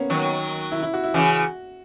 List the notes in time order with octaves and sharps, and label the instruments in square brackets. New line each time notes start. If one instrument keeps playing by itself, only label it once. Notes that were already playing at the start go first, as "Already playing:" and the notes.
Already playing: [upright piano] A#3 B3 C#4
[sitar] D#3 F#3
[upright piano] E4
E4
F#4
E4
[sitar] C#3 E3 [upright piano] F#4